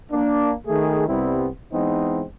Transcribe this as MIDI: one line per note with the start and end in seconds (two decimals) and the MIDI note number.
0.11 0.53 58
0.11 0.53 62
0.67 1.04 51
0.67 1.04 57
0.67 1.04 68
1.08 1.46 36
1.08 1.46 48
1.08 1.46 55
1.08 1.46 59
1.08 1.46 60
1.08 1.46 64
1.72 2.23 52
1.72 2.23 56
1.72 2.23 59
1.72 2.23 60
1.72 2.23 63